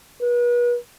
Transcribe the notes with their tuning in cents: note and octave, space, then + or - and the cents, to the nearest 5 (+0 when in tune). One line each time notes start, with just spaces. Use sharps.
B4 -35